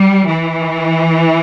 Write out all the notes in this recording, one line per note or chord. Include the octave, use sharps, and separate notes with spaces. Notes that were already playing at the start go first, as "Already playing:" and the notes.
Already playing: G3
E3